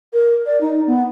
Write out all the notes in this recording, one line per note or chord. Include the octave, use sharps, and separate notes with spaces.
A#4
D5
D#4
B3